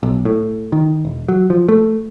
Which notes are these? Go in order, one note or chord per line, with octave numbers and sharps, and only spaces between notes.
B1
A2
D#3
E1
F#3
F3
A3